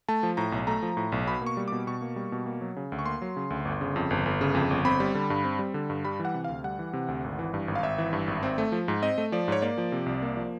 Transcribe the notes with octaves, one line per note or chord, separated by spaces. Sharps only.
A3 A5
F3
A2 A#5
B1
A3 A#5
F3
A2
B1
B2 B5
A#3 C#6
G3
B2 D6
B2 C#6
A#3
G3
B2
A#3
F#3
C#3
D2
C#6
A#3 C6
F#3
C#3
D2
G1
C#3
F2
G1
G1
C#3
F2
G1
C4 B5
G3
D3
G2
C4
G3
D3
G2
G3 B5
E3
F#5
C3
D2 F5
G3 F#5
E3
C3
D2
G#1
E3
G2
G#1
F5
G#1 E5
E3
G2
G#1
C4
A3
F3
G#2
C4 D#5
A3
F3 D5
G#2 C#5
A#3 D5
F3
C3
C2
A#3
F3